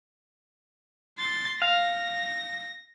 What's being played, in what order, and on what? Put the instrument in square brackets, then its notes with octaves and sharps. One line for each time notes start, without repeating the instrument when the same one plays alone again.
[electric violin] C6 A6
[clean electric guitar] F5 [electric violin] A#6